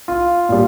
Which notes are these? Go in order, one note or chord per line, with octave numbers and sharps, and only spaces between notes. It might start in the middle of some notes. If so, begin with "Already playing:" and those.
F4
A#2 G3